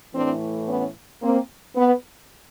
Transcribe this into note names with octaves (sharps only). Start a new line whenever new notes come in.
A2 E3 A3 C4 D4
B3 C#4
A#3 C4
B3